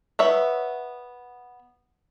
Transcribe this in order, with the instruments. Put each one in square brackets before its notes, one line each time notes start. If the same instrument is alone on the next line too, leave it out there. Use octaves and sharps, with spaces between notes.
[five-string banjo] B3 C#5 E5